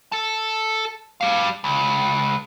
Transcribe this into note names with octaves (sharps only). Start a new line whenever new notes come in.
A4 A5
G3 F5
C#2